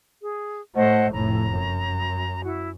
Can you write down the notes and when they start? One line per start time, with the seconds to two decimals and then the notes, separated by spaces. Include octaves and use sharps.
0.22 G#4
0.75 A2 A3 C5 D#5 F#5
1.11 F1 A2 A#5
1.52 F#2
2.44 E4 F#4